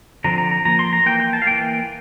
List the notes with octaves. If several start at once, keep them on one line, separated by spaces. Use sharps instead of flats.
D3 F3 C4 A#5
A#5
A#5
F3 A#3 A#5
C6
A#5
E3 A#3 G5
G5
A5
F5
E3 A#3 G5